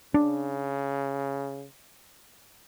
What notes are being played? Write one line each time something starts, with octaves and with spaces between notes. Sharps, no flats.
C#3 D4